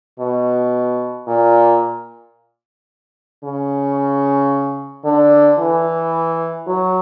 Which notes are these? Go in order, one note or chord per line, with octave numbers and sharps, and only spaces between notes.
B2
A#2
C#3
D3
E3
F#3